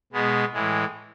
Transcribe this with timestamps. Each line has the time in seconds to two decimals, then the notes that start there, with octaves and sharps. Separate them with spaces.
0.13 B2 G#3 B3
0.53 A2 E3 G#3